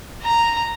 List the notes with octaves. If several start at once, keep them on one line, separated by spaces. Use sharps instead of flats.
A#5